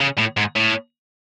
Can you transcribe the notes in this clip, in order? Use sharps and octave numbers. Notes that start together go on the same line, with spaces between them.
C#3
A2
G#2
A2